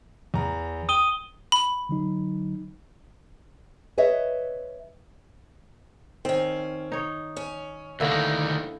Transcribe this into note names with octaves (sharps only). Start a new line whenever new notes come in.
E2 A#5
G5 D#6 D#7 G7
B5
D3 F#3 D#4
B4 C#5 D#5 E5
D#3 C4 C#4
D#4 C#5
C#4
D2 D3 D#3 A#3 E4